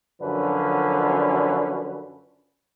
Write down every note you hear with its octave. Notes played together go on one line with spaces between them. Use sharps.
F#2 D3 F3 C#4 B4